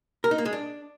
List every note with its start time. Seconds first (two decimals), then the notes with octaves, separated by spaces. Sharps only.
0.24 A#4
0.31 D#4
0.38 A#3
0.45 G#3
0.53 D4